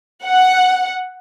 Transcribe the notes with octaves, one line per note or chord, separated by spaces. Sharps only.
F#5